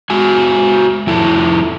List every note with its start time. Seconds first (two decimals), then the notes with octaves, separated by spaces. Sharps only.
0.10 G#3 F#4 G#5
1.07 F2 E4 A4